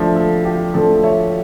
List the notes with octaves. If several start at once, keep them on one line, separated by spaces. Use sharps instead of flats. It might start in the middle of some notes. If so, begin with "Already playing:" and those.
Already playing: A2 F3 A3 D4 A4 E5
A4
G4
A2 F3 A3 D4 A4
C#5 E5